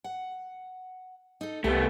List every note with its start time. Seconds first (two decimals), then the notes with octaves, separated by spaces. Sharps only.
0.04 F#5
1.41 D#4 A4
1.64 C2 A3 B3 G4